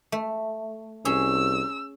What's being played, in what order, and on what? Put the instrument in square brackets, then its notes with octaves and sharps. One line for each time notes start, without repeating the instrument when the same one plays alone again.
[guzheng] A3
[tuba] C2 [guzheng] C#4 G#4 [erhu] E6